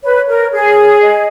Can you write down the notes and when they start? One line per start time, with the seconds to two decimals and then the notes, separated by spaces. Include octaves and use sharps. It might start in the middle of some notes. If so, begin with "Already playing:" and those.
0.03 B4 C#5
0.28 A#4
0.53 G#4
1.02 D#5